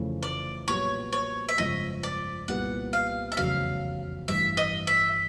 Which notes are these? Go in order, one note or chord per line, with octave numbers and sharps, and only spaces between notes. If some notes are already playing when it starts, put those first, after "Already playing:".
Already playing: F1 F2 C#3 E3 A3
D5
B1 A#2 G3 B3 C#5
C#5
E5
G1 F2 C#3 F3 G#3 D#5
D5
C2 A#2 G3 B3 F#5
F5
E5
F1 E2 C#3 F#3 F5
A1 G2 E3 E5
D#5
E5